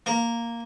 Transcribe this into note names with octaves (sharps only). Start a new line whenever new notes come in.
A#3